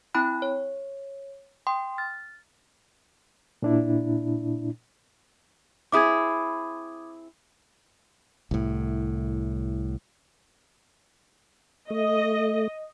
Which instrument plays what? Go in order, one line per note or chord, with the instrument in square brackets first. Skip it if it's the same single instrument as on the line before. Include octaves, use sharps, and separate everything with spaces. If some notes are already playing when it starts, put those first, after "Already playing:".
[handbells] C4 E4 G5 B5 F#6
C#5
G5 C6 D#6
F6 A6
[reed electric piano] A#2 D4 E4
[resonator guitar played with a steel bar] C4 E4 G#4 [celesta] D6 D#6 G#6
[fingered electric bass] C2 A2
[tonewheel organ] A3 [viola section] D#5